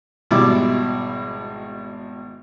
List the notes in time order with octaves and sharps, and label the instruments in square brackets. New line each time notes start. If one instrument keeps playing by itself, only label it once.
[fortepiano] G#1 B2 G3 E4 D6 E6